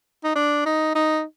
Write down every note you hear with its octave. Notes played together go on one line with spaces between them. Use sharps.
D#4
D4
D#4
D#4